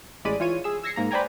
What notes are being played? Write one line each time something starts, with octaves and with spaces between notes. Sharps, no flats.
A1 G#3 D5 B5 D#7
E3 F4 C#5 D#7
G#4 E6
E6 G#6 A#6 C7 C#7
G#2 A#3 A#5
B4 C5 D5 G5 G#5 A#5